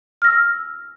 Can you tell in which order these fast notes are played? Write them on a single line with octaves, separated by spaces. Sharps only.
F6 A#6 E6